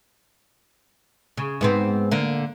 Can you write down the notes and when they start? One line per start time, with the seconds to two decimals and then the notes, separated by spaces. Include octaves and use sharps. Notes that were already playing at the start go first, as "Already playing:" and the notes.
1.37 C#3
1.61 G#2 B3 C4
2.11 D3 A#3